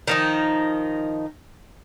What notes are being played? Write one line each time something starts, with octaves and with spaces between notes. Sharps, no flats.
D#3 F3 D#4